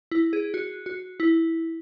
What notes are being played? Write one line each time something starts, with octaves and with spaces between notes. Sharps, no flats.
E4
G#4
F#4
F#4
E4